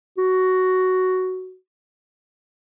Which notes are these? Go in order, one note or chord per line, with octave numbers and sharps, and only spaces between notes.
F#4